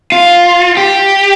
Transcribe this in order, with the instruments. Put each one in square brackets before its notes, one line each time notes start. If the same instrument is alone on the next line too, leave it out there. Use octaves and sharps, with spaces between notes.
[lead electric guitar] F4
G4